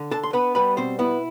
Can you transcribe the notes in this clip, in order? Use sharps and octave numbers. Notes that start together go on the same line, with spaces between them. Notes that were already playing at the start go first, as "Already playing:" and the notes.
Already playing: D3
D4 A4 A5
C6
B3 B4 B5
G3 B4 B5
B2 C4 C5
B3 E4 B4